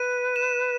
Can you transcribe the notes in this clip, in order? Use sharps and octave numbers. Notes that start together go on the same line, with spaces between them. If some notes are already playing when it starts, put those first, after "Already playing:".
Already playing: B4 D#7
E7